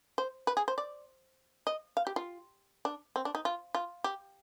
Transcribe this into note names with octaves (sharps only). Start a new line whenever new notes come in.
C5
B4
G#4
C5
D5
D#5
F5
G4
F4
D4
C4
D4
D#4
F4
F4
G4